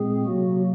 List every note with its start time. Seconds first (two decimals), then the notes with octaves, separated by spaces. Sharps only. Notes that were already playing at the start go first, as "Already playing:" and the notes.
Already playing: A#2 G#3 C4 G#4
0.25 C3 F#3 A#3 F#4